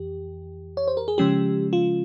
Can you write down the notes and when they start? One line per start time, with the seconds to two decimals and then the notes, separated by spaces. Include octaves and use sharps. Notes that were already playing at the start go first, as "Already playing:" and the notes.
Already playing: F2 E3 G4
0.77 C#5
0.88 C5
0.97 A#4
1.08 G#4
1.18 C#3 F3 G#3 C#4 G4
1.73 F4